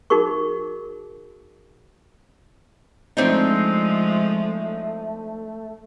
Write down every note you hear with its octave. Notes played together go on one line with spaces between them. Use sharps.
D#4 F#4 G#4 A#4 C#6
F3 G#3 A3 C4 D4 D#4